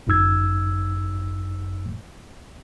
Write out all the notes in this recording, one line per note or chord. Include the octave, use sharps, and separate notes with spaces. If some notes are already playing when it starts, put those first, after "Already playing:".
G1 F#2 D#4 E6 G#6